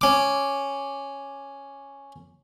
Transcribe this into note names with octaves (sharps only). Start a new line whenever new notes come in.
C#4 D6